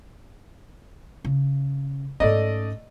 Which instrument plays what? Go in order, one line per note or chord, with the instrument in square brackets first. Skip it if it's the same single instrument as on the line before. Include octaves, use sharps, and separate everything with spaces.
[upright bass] C#3
[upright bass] G#2 C#4 [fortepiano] A3 D5 D#5